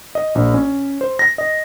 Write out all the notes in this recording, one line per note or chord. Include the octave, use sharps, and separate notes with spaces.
D#5
A#1
C#4
C5
A#6
D#5